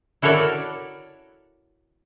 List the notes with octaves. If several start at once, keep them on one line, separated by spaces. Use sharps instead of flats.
E4 F#4 A4 A#4 C#5 D5